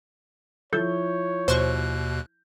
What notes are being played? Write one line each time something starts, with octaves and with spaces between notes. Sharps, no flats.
F3 E4 A4 C#5 G6
D#2 B2 C5 C6 C#6 F#6